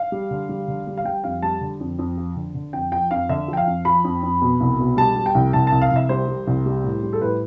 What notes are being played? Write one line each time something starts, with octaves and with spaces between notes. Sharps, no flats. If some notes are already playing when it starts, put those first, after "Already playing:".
Already playing: F5
G3
D3
G3
D3
G3
F5
G3 G5
F2 F5
G3 A5
D3
F2
F2
F3
D3
D3
F2 G5
F3 G5
F2 F5
D3 E5
F3 G5
F5
F2
F3 B5
F2
F2
B2
C2
B2
G3 A5
G3
G5
C2
C2 A5
C2 A5
F5
C2 E5
G3 C5
G3
C2
G3
A2
G3
A4
A2 B4